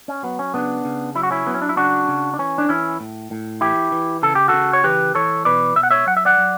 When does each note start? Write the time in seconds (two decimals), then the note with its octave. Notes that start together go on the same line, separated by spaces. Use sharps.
0.08 C#4
0.23 F#3 B3
0.39 C#4
0.54 C#3 B3 D4
0.85 C#3
1.15 F#3 E4
1.23 F#4
1.31 C#4 E4
1.46 F#3 B3
1.54 C#4
1.62 D4
1.69 E4
1.77 C#3 D4 F#4
2.08 C#3
2.34 D4
2.39 E3 C#4
2.58 D4
2.69 E3 C#4 E4
3.00 A2
3.31 A2
3.61 E3 E4 G4
3.92 E3
4.23 C#3 A4
4.35 G4
4.48 C#3 F#4 A4
4.73 C#5
4.84 E3 G4 B4
5.15 E3 A4 C#5
5.45 B2 B4 D5
5.76 B2 E5
5.83 F#5
5.91 C#5 E5
6.07 F#3 F#5
6.17 E5
6.25 D5 F#5
6.38 F#3